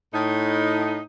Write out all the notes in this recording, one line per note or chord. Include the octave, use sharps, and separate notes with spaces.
A2 D#4